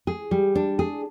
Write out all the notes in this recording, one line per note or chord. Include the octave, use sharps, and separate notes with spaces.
G#4
G3
D4
G#4